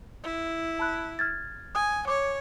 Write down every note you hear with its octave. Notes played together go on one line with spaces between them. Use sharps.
E4
A5 B5 F#6
F6 G#6 A6
G#5 D#6
C#5 D6